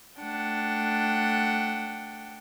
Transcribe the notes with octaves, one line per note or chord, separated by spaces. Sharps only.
A3 D4 F#5 G5